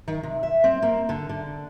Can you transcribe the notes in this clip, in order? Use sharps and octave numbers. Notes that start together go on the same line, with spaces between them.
D#3
C3
E5
C4
A#3
D3
D3